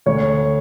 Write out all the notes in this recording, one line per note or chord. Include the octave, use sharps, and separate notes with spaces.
D2 C#5